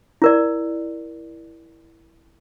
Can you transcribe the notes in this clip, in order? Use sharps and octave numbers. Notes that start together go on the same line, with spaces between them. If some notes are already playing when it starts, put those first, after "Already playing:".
E4 A#4 D5